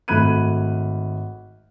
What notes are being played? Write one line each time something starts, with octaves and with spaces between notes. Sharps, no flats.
G#1 A3 B5 F#6 G#6 D#7